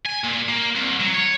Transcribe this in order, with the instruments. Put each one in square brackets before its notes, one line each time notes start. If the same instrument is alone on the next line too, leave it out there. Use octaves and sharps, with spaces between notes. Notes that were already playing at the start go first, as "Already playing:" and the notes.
[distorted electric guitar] G#5
A#2
A#3
C2
F#3
C#5